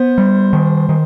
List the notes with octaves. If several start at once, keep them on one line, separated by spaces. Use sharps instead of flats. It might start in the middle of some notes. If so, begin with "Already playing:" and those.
Already playing: B3 C5
G3
D#3
D#3